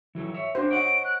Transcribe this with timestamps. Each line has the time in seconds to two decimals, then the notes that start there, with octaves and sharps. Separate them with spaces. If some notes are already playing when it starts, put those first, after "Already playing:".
0.15 E3 F#3 A4
0.34 C#5 E5
0.55 D4 F#4 C5
0.71 C#5 D#5 F#5 D7
1.04 F#6